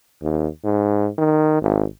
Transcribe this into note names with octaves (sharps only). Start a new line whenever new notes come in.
D#2
G#2
D#3
G#1